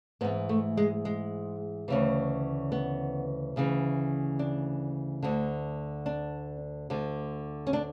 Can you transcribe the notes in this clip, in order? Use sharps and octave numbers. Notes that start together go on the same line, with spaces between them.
G#2 E3 B3
A3
G#3
G#3
D2 C#3 E3
B3
D2 C#3 E3
D4
D2 D3
D4
D2 D3
C#4
D4